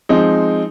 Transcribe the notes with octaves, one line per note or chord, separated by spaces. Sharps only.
F3 G#3 C4 D#4